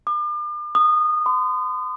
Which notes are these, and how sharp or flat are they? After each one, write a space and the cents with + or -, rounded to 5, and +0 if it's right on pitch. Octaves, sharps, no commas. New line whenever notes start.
D6 +40
D#6 -25
C6 -40